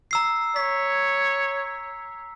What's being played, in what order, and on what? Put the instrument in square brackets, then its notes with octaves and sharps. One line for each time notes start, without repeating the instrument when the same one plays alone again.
[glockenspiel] A#5 E6 C7
[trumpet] C#5 [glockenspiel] B6